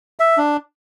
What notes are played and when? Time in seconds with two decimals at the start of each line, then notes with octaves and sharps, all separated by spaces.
0.20 E5
0.37 D4